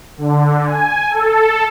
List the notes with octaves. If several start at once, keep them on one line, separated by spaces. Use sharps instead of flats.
D3
G#5
A4